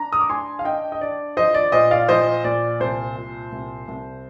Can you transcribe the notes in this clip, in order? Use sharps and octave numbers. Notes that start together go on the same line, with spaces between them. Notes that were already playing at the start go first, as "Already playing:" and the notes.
Already playing: D4 A#5
D#6
D6
D4 G#5 C6
F5
D4 D#5 G5
D#5
D4 D5
F3 C5 D#5
D5
A#2 C5 D#5
D5 F5
F3 C5 D#5
A#2 D5
C2 C5
A#2
C2
C2